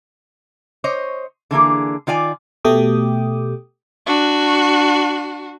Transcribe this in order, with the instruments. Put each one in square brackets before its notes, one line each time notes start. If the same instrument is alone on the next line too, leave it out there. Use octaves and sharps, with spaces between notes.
[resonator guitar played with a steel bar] C5 C#5 D#5
D3 E3 A#3 G#4
D#3 F4 D5 G#5
[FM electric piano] B2 A3 G4 G5 D6 D#6
[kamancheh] D4 F#4